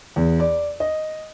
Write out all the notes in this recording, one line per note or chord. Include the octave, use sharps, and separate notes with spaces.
E2
D5
D#5